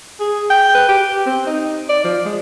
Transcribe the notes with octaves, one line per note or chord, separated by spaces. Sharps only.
G#4
G5
B4
G4
C4
D#4
D5
F3
G#3